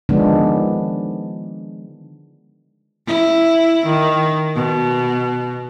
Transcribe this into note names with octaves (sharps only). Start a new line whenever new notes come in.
D3 D#3 F3 G#3 B3 D4
E4
D#3
B2